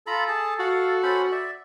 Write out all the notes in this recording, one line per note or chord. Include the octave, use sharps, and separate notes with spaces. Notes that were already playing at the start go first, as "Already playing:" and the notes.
F4 A4 A#5 B5
G#4 A5
F#4 F5
C#4 C5 B5
D5 E5